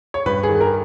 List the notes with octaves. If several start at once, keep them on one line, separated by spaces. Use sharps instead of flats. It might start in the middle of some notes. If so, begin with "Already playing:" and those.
C#5
G2 B4
G#4
D#3
A#4